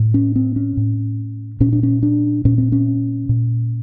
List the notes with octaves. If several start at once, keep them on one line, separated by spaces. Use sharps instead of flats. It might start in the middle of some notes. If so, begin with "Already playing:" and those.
Already playing: A2
C#4
C4
C#4
A2
A#2 C#4
D4
C#4
D4
A#2 C#4
C4
C#4
A#2